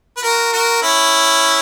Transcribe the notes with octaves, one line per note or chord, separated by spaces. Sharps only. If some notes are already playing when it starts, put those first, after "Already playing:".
B4
F#4 A#4
F#4 A#4
C#4 E4